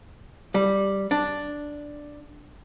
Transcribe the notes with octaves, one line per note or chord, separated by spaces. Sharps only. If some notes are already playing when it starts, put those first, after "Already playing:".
G3
D4